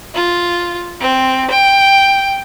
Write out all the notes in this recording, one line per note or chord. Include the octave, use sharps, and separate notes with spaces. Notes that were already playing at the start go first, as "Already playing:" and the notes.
F4
C4
G5